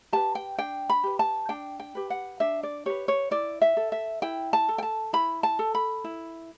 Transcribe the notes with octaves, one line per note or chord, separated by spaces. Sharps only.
G4 B4 A5
G5
D4 G5
B5
G4 B4
A5
D4 G5
G5
G4 B4
F#5
D4 E5
D5
G4 B4 C#5
C#5
E4 D5
E5
A4
E5
E4 G5
A5
A4
G5
A5
E4 B5
A5
A4
B5
E4